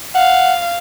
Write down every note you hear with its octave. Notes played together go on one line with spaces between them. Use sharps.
F5 F#5